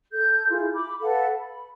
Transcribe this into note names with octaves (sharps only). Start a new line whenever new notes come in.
A4 G6
E4 F4 G#4
B5 D6
A4 B4 F5 F#5
B5